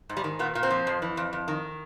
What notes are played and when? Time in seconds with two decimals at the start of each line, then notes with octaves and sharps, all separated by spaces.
0.09 G#2
0.17 G3
0.24 D#3
0.39 A#2 B3
0.55 A#2
0.63 C4
0.70 F3
0.87 F2
1.02 E3
1.17 F2
1.33 F2
1.48 D#3